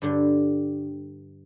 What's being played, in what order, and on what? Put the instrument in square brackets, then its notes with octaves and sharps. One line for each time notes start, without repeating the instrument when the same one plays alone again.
[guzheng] G2 D3 G3